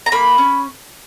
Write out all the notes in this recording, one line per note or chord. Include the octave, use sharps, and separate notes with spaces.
A#5
A#3 B5
C#4